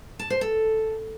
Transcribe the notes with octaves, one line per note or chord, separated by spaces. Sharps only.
A5
C5
A4